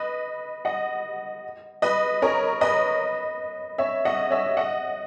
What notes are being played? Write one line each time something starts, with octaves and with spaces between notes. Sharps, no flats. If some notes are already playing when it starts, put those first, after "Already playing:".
Already playing: B4 D#5
D#5 F#5
B4 D#5
A#4 C#5
B4 D#5
C#5 E5
D#5 F#5
C#5 E5
D#5 F#5